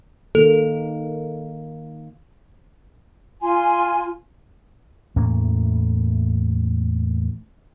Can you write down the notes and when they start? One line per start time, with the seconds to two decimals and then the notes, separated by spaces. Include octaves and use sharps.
0.35 D#3 A#3 A4
3.42 F4 G#5 C6
5.16 E2 A2 A#3 C#4